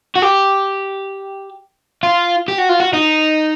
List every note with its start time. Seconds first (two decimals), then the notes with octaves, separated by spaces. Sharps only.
0.16 F#4
0.22 G4
2.03 F4
2.48 G4
2.58 F#4
2.69 F4
2.80 F#4
2.93 D#4